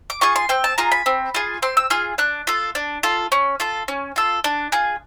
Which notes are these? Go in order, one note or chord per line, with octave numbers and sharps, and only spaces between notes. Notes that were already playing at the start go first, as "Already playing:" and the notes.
D6
F4 G#4 C#6
C6
C4 G5
A5
F4 G#4 A#5
B5
C4
F4 G#4
C4 C6
E6
F4 G#4 F6
D4 F#6
F4 A4
D4
F4 A4
C#4
F4 A4
C#4
F4 A4
D4 F#6
F4 G#4